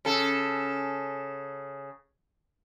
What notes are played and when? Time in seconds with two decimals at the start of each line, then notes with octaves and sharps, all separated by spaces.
0.05 C#3 A4